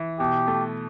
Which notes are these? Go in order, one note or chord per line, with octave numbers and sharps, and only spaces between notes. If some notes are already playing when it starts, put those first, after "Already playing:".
Already playing: E3
B2 G4
A3